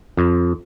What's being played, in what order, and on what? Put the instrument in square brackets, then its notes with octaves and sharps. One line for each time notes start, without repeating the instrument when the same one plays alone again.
[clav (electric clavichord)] F2